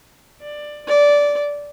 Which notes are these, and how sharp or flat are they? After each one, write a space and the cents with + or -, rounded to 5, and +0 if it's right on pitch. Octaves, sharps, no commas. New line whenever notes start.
D5 +15
D5 -15